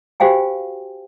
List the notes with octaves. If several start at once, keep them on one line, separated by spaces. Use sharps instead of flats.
F#4 G4 C5 F5 G5 G#5